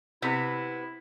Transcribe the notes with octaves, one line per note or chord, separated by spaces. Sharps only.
C3 B3 E4